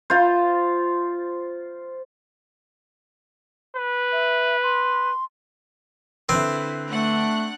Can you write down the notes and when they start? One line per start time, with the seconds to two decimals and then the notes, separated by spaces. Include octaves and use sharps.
0.10 F4 C5
3.76 B4
4.12 E5
4.63 C6
6.29 D3 C4 E4 B4
6.89 A3 D4 F#5 F#6